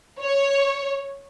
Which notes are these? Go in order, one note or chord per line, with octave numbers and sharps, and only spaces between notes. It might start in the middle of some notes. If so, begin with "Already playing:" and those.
C#5